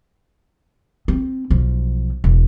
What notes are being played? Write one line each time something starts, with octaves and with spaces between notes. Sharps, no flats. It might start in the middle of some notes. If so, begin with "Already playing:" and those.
C4
B1 F3
E1